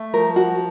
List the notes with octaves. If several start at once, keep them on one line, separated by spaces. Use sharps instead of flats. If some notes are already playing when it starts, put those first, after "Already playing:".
Already playing: A3
F3 A#4
F#4